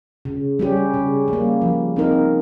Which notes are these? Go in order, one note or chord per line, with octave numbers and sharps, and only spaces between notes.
C#3
G3 C#4 G4
C#3
G3
A#3
F3
C4 D#4 A#4